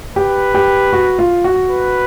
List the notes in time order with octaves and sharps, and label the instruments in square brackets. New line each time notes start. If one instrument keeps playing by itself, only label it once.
[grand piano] G4 [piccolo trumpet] B4
[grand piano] G4
F#4
F4
F#4
[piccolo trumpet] B4